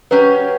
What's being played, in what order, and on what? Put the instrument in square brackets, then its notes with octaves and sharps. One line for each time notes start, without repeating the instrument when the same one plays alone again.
[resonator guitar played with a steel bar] F#3 C#4 G4 [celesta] B4